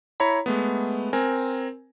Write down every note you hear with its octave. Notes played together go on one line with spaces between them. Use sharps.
E4 C#5 A#5 B5
G#3 A3 B3
C4 A#4 G#5